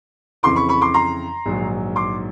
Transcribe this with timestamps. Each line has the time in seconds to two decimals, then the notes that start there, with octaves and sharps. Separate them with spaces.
0.43 F2 C#3 E3 C6 D6
0.56 B5 C#6
0.69 B5 C#6
0.81 C6 D6
0.94 A#5 C6
1.46 A#1 G#2 D#3 F#3
1.96 C6 D6